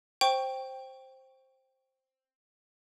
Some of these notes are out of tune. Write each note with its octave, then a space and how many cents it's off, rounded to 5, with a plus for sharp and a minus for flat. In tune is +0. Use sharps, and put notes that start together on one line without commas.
C5 +10 G5 +0 C#6 +0